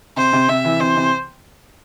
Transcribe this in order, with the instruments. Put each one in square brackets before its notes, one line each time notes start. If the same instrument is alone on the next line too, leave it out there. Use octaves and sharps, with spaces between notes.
[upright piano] C3 [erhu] C5
[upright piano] C3
[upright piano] C3 [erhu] E5
[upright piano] E3
[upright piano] C3 [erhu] C5
[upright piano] C3